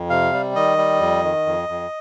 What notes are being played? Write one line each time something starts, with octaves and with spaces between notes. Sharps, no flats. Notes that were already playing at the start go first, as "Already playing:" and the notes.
Already playing: F2
C3 F5
G3
D#3 D#5
G3
F2
D#3
F2
F2